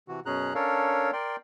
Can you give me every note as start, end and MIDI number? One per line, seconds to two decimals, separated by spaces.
0.08 0.20 48
0.08 0.20 52
0.08 0.20 66
0.26 0.54 42
0.26 0.54 47
0.26 0.54 61
0.26 0.54 68
0.26 0.54 82
0.26 0.54 90
0.55 1.11 61
0.55 1.11 62
0.55 1.11 69
0.55 1.11 70
0.55 1.11 73
0.55 1.11 77
1.13 1.36 70
1.13 1.36 74
1.13 1.36 79
1.13 1.36 84